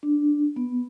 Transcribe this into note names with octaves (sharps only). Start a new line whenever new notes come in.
D4
B3